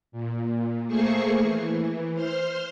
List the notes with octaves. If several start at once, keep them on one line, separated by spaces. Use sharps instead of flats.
A#2
A3 A#3 G#4 C5 C6 C#6
E3
C5 C6 F6